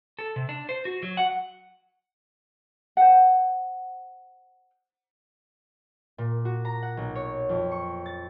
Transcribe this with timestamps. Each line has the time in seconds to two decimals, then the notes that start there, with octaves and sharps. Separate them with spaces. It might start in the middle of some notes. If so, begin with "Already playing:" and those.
0.19 A4
0.36 C3
0.49 D4
0.69 C5
0.85 F#4
1.03 F#3
1.17 F#5
2.97 C5 F#5
6.18 A#2
6.45 F#4
6.65 A#5
6.83 F#5
6.97 B1
7.15 C#5
7.49 F2
7.71 C#6
8.06 A6